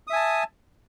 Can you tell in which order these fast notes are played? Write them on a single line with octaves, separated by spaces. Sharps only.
D#6 E5 G#5 A5